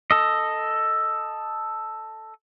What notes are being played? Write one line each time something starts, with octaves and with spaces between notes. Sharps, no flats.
A4 D#5